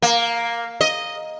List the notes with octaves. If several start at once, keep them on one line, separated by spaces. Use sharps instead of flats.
A#3
D#5